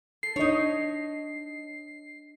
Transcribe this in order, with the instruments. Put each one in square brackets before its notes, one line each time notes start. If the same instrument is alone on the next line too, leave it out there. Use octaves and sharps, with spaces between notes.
[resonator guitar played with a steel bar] A4 [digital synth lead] C7
[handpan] D4 D#5 [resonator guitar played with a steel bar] D#4 C#5